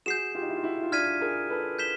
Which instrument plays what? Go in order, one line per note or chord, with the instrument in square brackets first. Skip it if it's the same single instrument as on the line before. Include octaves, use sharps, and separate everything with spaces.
[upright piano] F#4 G#4 [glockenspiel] G6 C7 E7
[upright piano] F4 G4
D#4
E4
F4
E4 F#4
F4
[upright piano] D4 E4 [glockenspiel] F6 G#6 B6 D#7
[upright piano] G#4 A#4
A4 B4
[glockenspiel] G6 B6 E7 G7